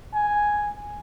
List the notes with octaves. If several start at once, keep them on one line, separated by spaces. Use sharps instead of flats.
G#5